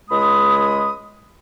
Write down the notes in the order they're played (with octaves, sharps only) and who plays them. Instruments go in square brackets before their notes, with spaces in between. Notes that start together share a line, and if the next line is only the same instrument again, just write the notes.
[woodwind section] C#2 G#3 B5 D#6